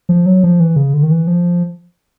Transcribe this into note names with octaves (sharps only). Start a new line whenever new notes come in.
F3
F#3
F3
E3
C#3
D3
D#3
E3
F3